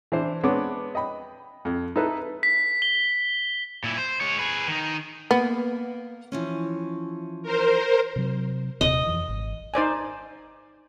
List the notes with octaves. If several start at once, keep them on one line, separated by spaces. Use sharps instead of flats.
E3 D4 C5
G#3 B3 C4 D4 C#5 D6
D#5 G5 B5
F2
D#4 E4 A4 B4
B6
G7
A#2 E4
C5
G#3 C#5
G#4 B4
D#3 D#4
A#3 B3
E3 F3 C#4
A#4 C5
C3 F#3
D#1 C3 D#5
F2 E3
G#1
D#4 C5 D5 G#5